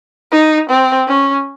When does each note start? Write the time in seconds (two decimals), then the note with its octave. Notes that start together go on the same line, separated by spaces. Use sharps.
0.32 D#4
0.69 C4
1.07 C#4